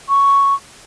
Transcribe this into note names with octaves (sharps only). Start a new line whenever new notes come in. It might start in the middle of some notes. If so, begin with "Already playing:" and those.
C#6